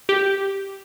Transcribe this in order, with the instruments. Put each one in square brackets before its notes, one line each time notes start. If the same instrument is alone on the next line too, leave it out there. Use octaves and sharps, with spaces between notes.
[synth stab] G4